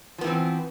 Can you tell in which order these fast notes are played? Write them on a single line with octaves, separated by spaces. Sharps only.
F3 B3 E3 C4